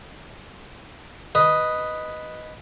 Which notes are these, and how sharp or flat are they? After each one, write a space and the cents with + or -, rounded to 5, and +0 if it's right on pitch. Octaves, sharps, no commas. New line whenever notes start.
B4 +0 D#5 +0